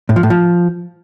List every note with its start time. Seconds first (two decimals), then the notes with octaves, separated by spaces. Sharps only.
0.09 A2
0.16 F3
0.23 A2
0.30 F3